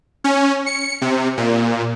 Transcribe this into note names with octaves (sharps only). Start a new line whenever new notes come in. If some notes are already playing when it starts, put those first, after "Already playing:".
C#4
C#7
C3
A#2